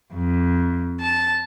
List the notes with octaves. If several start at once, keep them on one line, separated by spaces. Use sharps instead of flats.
F2
A5